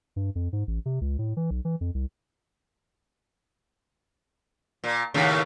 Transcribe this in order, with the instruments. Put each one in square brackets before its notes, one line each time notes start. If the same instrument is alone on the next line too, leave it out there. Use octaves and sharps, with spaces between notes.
[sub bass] G2
F2
G#2
A1
C3
C#2
A2
E3
B1
E3
F2
C2
[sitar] A#2
D#2 A2 C#3